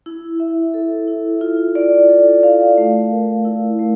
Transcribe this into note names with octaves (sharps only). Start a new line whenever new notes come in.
E4
E5
A4
E4
F4
D5
A4
F5
A3
A#4
E4
A3